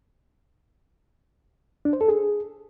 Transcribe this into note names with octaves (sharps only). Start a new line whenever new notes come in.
D4
C5
A4
G#4